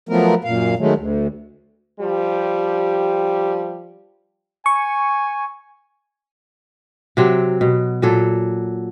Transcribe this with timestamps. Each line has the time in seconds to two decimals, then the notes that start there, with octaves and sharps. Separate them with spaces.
0.09 F3 F#3 A3 B3 A#4
0.44 F#2 A#2 F5
0.78 D#3 F#3 G#3 A3
0.96 D2
2.00 F3 G3 G4
4.66 G#5 C#6
7.17 C3 F#3 C4
7.61 B2
8.02 A#2 F#3 A4